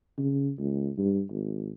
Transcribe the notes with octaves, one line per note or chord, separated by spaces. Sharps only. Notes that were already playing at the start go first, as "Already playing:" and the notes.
C#3
C#2
G2
G#1